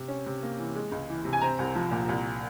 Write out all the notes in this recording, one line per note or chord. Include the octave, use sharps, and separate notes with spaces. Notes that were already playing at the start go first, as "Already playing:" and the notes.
Already playing: C3
C#4
C3
A#3
E3
G#3
C#2
E3
C3
G#5
C4 A#5
C2
F3
A#2
C2